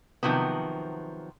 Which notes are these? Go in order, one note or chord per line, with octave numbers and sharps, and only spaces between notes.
C3 D#3 F3 F#3 B3